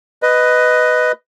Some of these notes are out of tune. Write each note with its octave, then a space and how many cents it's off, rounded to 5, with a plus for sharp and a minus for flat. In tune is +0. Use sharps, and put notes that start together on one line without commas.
B4 +10 D#5 +0